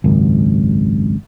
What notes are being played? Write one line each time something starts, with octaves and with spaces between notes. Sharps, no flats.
G#1 C#2 F#2